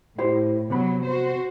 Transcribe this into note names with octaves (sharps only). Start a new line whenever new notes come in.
A2 E4 G4 C5
C3 F#3 B3 B5
F#4 C5